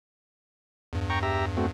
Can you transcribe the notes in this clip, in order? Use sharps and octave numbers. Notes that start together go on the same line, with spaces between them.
E2 G2
G5 A#5 C#6
G4 E5 A#5
A3 C4 F#4